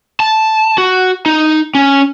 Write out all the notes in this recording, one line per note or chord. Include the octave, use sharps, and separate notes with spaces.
A5
F#4
D#4
C#4